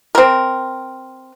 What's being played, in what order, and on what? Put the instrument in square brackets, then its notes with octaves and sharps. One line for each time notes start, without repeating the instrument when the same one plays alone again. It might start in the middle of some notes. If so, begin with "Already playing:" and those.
[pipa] C4 A#4